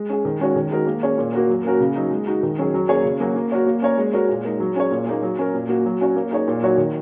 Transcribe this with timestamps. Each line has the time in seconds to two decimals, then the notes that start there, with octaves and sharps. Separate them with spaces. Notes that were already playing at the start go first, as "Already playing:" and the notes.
Already playing: G#3
0.09 C#4 G#4
0.25 D#3
0.40 G#3 C#4 F#4 C#5
0.56 D#3
0.71 G#3 D#4 F#4 A#4
0.87 A#3
1.03 C#4 G#4 C#5
1.18 A#2
1.34 A#3 F#4 A#4
1.49 F#3
1.65 A#3 C#4 F#4 A#4
1.80 C#3
1.95 F#3 D#4
2.11 G#3
2.27 D#4 F#4
2.43 D#3
2.58 F#3 C#4 G#4
2.74 F#3
2.89 A#3 C#4 G#4 C#5
3.05 C#3
3.20 F#3 A#3 C#4 F#4
3.36 A#3
3.52 F#4 A#4 C#5
3.67 A#3
3.82 C#4 A#4 C#5
3.98 G#3
4.13 F#4 A#4 C#5
4.29 A#2
4.45 G#3 D#4 A#4
4.60 F#3
4.76 C#4 G#4 C#5
4.91 A#2
5.07 A#3 D#4 G#4
5.23 F#3
5.39 C#4 A#4
5.54 A#2
5.69 A#3 F#4
5.86 F#3
6.01 C#4 F#4 C#5
6.16 A#3
6.31 D#4 G#4 C#5
6.48 A#2
6.63 F#3 D#4 F#4 C#5
6.78 D#3